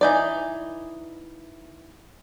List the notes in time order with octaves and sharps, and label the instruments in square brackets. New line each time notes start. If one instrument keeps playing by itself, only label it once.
[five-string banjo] E3 D#4 D5